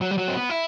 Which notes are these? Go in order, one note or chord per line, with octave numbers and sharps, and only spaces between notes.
F#3
G3
F#3
C4
B3
E4